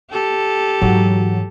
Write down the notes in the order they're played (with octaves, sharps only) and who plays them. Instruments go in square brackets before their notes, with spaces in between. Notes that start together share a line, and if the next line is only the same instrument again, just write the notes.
[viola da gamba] G4 A4
[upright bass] G#2 E3 [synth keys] F#3